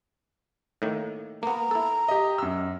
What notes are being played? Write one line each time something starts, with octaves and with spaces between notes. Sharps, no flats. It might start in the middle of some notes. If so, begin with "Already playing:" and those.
A2 D#3 A#3
A#3 B3 A#5
E4 A4
G4 D#5
F#2 E6